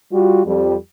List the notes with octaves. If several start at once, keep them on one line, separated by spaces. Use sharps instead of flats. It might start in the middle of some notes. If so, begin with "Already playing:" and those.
G3 F4 F#4
F2 G3